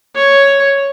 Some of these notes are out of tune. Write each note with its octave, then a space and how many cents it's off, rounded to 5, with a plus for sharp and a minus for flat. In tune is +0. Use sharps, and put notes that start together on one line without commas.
C#5 +0